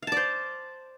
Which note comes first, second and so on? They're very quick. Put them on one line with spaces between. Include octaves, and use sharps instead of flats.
F5 A5 D5 C5